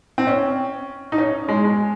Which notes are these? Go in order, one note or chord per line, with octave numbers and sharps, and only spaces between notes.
C4
C#4
D#4
C#4
G#3
G#3